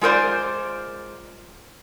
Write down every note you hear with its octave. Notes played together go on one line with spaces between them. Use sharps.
G#3 F4 A#4 C5 D5